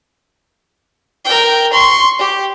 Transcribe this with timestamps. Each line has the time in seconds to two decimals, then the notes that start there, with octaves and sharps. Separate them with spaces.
1.25 A#4 G5
1.72 C6 C#6
2.19 G4